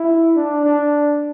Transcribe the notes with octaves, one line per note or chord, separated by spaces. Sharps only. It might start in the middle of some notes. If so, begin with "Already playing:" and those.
Already playing: E4
D4
D4